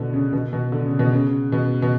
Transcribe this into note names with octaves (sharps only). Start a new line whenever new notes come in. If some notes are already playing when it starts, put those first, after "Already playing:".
Already playing: B2 D3
C#3
B2
B2
D3
C#3
B2
C#3
B2
B2